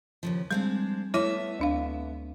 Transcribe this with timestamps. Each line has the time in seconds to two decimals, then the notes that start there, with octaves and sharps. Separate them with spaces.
0.23 D#2 C#3 F3
0.51 G3 G#3 C4 D4
1.14 A3 B3 E4 C#5 E5
1.59 D2 D4 F5